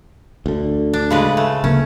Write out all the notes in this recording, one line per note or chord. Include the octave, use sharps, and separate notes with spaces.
D2 D3
D4
C#3 G#3 B4
A3
D1 C#3 A#3 C#4